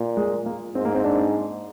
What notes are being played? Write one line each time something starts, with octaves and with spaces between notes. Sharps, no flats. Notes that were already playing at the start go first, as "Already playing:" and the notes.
Already playing: A#2
G#3
A#3
G#2 C4
A#3
C4
D4